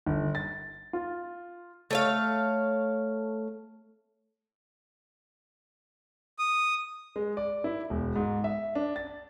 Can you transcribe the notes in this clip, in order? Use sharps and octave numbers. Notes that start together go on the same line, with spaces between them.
G1
A6
F4
A3 C#5 F5
D#6
G#3
D5
E4
E1
G#2
E5
D4
A6